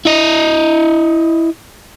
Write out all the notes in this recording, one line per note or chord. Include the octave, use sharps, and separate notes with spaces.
E4 D#5